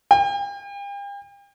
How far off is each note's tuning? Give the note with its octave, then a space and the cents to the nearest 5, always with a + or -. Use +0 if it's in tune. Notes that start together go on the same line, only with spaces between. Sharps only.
G5 +40